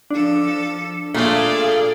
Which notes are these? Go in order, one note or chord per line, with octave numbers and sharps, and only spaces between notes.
F3 D4 A4
A#2 A3 F4 G#4 D5 F5